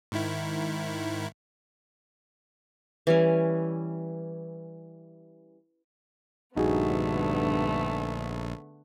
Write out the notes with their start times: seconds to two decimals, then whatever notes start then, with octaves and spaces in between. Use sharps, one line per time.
0.12 G#2 D#3 E4
3.07 E3 G3 C#4
6.56 A#1 G2 D3 A3 B3 D#4 F#4 G#4